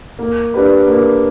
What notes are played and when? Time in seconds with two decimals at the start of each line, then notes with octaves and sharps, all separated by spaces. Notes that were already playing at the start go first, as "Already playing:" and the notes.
0.19 A#3
0.54 D4 G4 B4
0.87 A#3